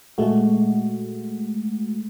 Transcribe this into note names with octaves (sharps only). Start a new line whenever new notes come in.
A#2 G#3 A3 F#4